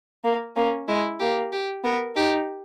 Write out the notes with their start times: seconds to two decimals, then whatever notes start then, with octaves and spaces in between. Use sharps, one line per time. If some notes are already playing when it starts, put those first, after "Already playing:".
0.24 A#3
0.56 A#3 C#4
0.88 G#3 E4
1.20 A#3 G4
1.52 G4
1.84 B3 A#4
2.16 D#4 G4